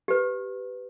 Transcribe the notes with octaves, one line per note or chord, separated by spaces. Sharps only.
G4 B4